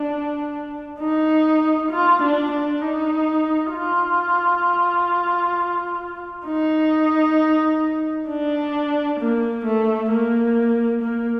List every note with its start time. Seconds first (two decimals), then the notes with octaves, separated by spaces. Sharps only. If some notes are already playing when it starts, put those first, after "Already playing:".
Already playing: D4
1.00 D#4
1.91 F4
2.22 D4
2.51 D4
2.82 D#4
3.73 F4
6.47 D#4
8.28 D4
9.20 A#3
9.66 A3
10.11 A#3
11.02 A#3